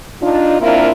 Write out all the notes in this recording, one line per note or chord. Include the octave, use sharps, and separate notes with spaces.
D4 D#4 F4
A#3 C4 D4 E4 F4 A#4